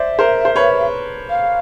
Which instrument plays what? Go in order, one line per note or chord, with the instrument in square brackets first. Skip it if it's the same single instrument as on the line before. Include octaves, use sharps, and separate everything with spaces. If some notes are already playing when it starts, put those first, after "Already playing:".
Already playing: [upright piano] C5 D5 [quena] E5
[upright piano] A#4 C5
C5
B4 C#5
[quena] F5